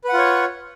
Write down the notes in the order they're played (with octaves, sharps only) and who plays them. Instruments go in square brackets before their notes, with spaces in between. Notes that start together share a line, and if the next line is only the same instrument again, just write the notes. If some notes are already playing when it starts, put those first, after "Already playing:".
[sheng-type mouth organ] B4
F#5
F4
C#5